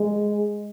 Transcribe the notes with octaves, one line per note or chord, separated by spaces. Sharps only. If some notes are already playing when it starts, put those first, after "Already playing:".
Already playing: G#3